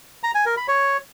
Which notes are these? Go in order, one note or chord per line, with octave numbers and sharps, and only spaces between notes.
A#5
G#5
A#4
B5
C#5